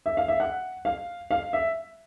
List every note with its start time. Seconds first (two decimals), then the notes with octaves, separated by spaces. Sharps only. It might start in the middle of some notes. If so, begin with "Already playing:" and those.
0.06 E5
0.17 F5
0.28 E5
0.40 F#5
0.85 F5
1.31 F5
1.53 E5